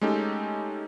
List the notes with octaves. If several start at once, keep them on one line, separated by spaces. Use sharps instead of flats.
G#3 A3 C#4 D#4 G4 A4